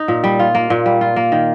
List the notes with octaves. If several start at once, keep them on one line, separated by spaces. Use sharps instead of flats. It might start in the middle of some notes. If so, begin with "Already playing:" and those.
Already playing: D#4
A#2
G3
F4
A#3
A#2
G3
F4
A#3
D#3